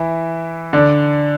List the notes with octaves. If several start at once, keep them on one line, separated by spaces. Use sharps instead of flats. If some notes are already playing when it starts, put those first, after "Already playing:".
Already playing: E3 E4
D3 D4